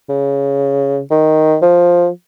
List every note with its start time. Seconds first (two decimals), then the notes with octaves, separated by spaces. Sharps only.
0.09 C#3
1.11 D#3
1.62 F3